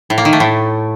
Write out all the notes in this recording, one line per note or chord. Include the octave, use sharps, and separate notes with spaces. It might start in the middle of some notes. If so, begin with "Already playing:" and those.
A2
A#3
D#3
A3
A2